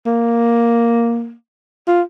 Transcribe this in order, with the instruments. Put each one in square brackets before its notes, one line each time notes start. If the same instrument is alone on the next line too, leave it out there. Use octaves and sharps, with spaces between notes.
[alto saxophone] A#3
F4